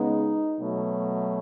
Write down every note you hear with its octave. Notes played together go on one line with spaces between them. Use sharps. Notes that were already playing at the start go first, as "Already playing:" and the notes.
Already playing: C#3 G#3 B3 D#4
B2 F#3 A3